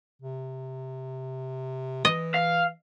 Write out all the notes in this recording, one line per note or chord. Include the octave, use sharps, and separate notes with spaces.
C3
E3 D#5
F5